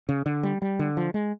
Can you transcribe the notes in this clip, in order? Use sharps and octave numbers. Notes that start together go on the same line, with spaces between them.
C#3
D3
G3
G3
D3
F3
G#3